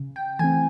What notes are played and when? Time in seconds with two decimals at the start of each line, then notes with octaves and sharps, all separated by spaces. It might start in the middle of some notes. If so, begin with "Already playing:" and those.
Already playing: C#3
0.16 G5
0.39 E3 A3 C4 G#5